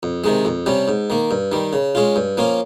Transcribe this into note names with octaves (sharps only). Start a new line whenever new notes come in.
F2
C3 D#3 G#3
F2
C3 G3 C#4
G#2
D#3 A#3
G2
D#3 G3
C#3
G#3 C#4 F4
G2
F3 A#3 C#4 F4